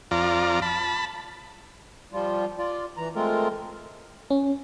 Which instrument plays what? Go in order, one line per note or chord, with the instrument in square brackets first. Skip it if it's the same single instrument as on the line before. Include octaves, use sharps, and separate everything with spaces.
[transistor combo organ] F2 F4 D5 A#5
A5 B5
[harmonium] F3 G3 F4
F4 D5
E3 A#5
G#3 A3 C4 F4 A#4
[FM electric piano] C#4